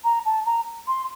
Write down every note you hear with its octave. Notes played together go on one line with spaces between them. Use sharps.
A#5
A5
A#5
C6